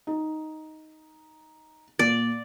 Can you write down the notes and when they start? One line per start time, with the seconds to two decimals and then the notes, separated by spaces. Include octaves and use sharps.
0.07 D#4
1.99 A#2 D5